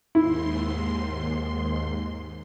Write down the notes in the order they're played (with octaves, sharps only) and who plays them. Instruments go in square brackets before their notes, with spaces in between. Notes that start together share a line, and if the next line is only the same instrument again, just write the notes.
[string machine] D#2 G#2 C6 [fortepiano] E4